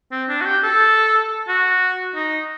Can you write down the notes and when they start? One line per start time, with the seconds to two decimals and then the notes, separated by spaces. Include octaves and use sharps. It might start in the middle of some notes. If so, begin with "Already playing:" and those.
0.12 C4
0.29 D4
0.41 F#4
0.46 G4
0.64 A4
1.48 F#4
2.15 D#4